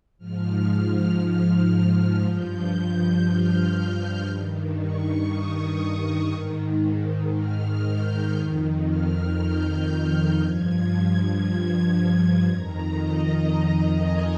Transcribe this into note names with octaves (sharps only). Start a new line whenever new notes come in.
G#2 F3 F6
G2 F3 G6
F6
G2 D#3
C#6
D#6
G#2 D#3
F6
G6
F2 D#3
F6
G6
G2 F3 G#6
G#6
F2 D#3 A#5
D#5
G#5